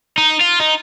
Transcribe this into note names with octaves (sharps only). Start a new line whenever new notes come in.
D#4
F4
D#4